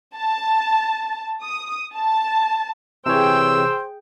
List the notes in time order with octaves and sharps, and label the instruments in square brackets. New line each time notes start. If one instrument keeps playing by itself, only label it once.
[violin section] A5
D#6
A5
[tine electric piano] C3 E3 C#5 [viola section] G#4 G5 [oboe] C5 [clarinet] E6